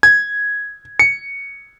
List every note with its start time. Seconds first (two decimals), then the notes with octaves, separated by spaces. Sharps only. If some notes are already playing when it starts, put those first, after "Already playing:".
0.03 G#6
0.99 C#7